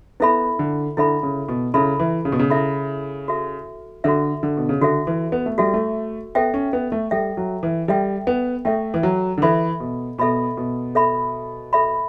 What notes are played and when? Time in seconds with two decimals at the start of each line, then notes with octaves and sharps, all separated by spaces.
0.20 B3 E4 A4 E5 B5
0.59 D3
0.97 D3 E4 A4 E5 B5
1.23 C#3
1.48 B2
1.74 C#3 E4 A4 E5 B5
1.99 E3
2.25 C#3
2.32 B2
2.39 C#3
2.50 E4 A4 E5 B5
3.28 F#4 A4 E5
4.04 D3 F#4 A4 E5
4.43 D3
4.57 B2
4.69 C#3
4.81 D3 F#4 A4 E5
5.07 E3
5.32 B3
5.46 A3
5.58 G3 F#4 A4 E5
5.74 A3
6.35 B3 A4 E5 G5
6.54 C#4
6.73 B3
6.92 A3
7.11 G3 A4 E5 G5
7.37 F#3
7.63 E3
7.88 G3 A4 E5 G5
8.27 B3
8.65 A3 A4 E5 G5
8.94 E3
9.03 F#3
9.38 D3
9.42 E3 A4 E5 B5
9.80 B2
10.18 B2 A4 E5 B5
10.57 B2
10.95 A4 E5 B5
11.73 A4 E5 B5